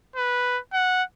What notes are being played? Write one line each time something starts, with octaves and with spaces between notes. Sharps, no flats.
B4
F#5